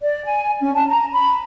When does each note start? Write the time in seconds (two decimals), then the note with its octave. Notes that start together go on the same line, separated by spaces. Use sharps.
0.02 D5
0.25 G#5
0.60 C#4
0.75 A5
0.88 A#5
1.13 B5